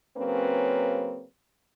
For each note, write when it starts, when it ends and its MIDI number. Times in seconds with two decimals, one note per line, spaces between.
0.18 1.25 49
0.18 1.25 54
0.18 1.25 58
0.18 1.25 60
0.18 1.25 61
0.18 1.25 71